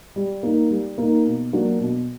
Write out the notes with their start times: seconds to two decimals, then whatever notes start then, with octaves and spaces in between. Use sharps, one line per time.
0.16 G3
0.43 A#3 D#4
0.71 G3
0.98 A#3 D#4
1.25 B2
1.53 F#3 A#3 D4 F#4
1.80 B2